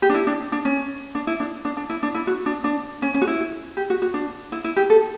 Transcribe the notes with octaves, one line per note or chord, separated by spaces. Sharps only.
G4
D4
E4
D4
D4
C#4
D4
E4
D4
D4
D4
E4
D4
E4
F#4
D4
D4
C#4
C#4
F#4
E4
G4
F#4
F#4
D4
E4
E4
G4
A4